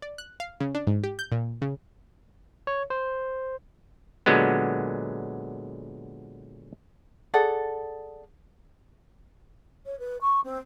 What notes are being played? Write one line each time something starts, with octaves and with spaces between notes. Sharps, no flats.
D5
F#6
F5
C#3
D4
G#2
G4
G6
A#2
C#3
C#5
C5
A#2 D3 F#3 G#3 B3
G#4 A4 D5 F#5
C#5
B4
C#6
C4